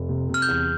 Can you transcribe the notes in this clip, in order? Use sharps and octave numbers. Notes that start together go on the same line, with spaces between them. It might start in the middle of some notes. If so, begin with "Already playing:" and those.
Already playing: F1
C3
C3
F6
G6
E2